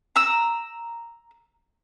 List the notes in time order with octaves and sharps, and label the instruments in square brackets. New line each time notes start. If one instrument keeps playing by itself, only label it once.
[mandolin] A#5 E6